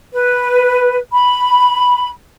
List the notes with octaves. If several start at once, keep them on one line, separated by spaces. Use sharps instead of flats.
B4
B5